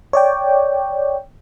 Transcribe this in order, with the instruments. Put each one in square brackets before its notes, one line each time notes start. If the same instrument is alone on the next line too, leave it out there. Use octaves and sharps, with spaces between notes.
[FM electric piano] C#5 D5 G5